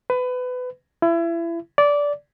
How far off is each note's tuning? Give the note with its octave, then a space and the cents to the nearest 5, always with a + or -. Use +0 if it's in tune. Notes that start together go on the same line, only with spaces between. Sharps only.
B4 +25
E4 +30
D5 -15